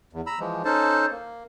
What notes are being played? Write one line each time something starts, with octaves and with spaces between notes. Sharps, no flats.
E2
A#5 B5 E6
E3 F3 G#3
C#4 D#4 A4 C5 A5
A#3